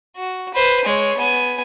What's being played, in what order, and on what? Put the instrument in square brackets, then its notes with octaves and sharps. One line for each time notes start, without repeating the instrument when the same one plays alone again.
[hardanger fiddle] F#4
B4 C5
G#3 C#5
B3 G#5